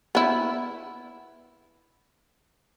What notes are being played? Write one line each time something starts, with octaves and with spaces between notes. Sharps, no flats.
B3 E4